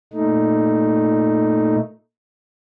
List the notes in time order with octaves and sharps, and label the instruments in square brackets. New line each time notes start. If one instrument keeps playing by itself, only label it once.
[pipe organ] A#2 A3 D#4